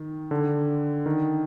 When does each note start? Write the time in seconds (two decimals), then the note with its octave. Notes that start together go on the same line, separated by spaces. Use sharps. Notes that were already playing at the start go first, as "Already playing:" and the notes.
Already playing: D#3
0.31 D3
1.06 D#3